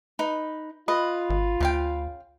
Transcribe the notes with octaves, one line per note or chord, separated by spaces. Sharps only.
D#4 B4
F4 B4 D#5
G#1
D2 C#3 F5 G5